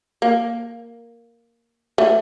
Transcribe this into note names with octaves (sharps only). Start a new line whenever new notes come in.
A#3
A3